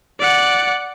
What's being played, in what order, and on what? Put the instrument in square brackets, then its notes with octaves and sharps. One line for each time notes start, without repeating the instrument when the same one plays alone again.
[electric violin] D5 F#5